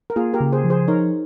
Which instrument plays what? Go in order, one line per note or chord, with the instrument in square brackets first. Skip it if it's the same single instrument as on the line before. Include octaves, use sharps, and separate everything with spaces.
[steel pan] A#4
[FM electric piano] A#3 [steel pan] F4 G#4
[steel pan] G4 A#4
[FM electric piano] C#3
[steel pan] G#4 C5
[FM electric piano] F3
[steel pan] G#4 C5
[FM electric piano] D#4 [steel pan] A#4 C#5